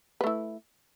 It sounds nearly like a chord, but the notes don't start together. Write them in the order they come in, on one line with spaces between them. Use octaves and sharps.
B4 A3 E4